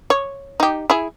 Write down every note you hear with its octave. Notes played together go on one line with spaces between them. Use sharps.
C#5
D#4 G4
E4 G#4